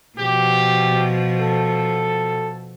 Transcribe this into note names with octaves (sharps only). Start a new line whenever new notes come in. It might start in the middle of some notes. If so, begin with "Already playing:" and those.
B2 F3 G4
A4